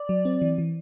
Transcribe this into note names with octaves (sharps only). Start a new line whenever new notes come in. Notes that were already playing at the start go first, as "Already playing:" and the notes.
Already playing: D5
F#3
C4
E3
E3